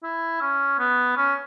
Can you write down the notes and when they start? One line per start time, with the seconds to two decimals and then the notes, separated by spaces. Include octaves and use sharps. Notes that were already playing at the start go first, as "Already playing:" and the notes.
0.03 E4
0.41 C#4
0.79 B3
1.17 C#4